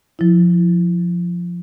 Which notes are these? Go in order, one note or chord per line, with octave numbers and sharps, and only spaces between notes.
F3 E4